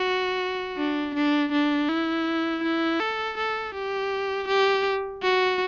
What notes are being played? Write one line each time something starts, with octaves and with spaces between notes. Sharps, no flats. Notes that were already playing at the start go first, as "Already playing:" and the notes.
Already playing: F#4
D4
D4
D4
E4
E4
A4
A4
G4
G4
F#4